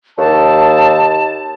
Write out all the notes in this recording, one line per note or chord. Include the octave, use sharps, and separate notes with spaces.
D#2 A5